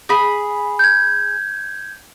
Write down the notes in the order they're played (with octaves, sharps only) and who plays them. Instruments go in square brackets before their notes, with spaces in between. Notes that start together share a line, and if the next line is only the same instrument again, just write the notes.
[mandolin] G#4 B5
[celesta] G6 G#6